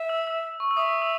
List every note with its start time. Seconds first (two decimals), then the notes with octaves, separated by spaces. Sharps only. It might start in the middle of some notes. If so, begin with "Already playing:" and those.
Already playing: E5
0.09 E6
0.27 E6
0.60 C#6
0.71 E6
0.77 E5 D#6
1.02 E6